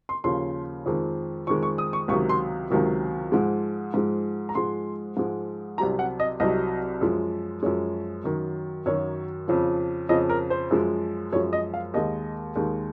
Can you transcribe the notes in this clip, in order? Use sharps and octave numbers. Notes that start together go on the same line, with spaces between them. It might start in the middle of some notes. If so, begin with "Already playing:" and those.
C6
D#2 C#3 F3 C6
F2 D#3 G#3
F2 D#3 G#3 C#6
C#6
D#6
C#6
C#2 C3 D#3 F#3 C#6
C6
C#2 C3 D#3 F#3
G#2 F3 G#3
G#2 F3 G#3
A#5
G#2 F3 G#3 C6
G#2 F3 G#3
C2 C3 F#3 A#5
F#5
D#5
C2 C3 F#3 D#5
F#2 F3 G#3
F#2 F3 G#3 C#5
F#2 D#3 F#3
F#2 D#3 F#3 C#5
F2 C#3 F3
F2 C#3 F3 D#5
A#4
C5
F#2 F3 G#3
F#2 F3 G#3 C#5
D#5
F5
D#2 D#3 G#3 D#5
D#2 D#3 G#3